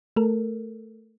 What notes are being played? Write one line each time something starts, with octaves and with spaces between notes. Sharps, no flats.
A3 A4 A#4